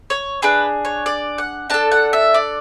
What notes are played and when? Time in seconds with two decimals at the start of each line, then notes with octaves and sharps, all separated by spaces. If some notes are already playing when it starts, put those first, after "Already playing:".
0.10 C#5
0.42 D4 G#4 B4
0.85 C#5
1.06 D5
1.38 F#5
1.70 D4 A4 A5
1.92 F#5
2.13 E5
2.34 D5